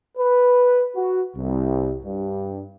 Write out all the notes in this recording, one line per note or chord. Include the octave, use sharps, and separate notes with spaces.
B4
F#4
C2
G2